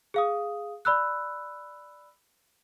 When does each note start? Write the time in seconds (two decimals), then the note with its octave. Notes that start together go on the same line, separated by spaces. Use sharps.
0.14 G#4 F5 D#6
0.85 D5 B5 E6 F#6